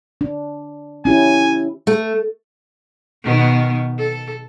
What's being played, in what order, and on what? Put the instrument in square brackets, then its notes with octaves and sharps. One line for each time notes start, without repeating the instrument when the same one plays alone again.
[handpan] D4
[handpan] C#4 E4 G4 [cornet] G#5
[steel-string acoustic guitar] A3
[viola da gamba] B2 D#3 B3
A4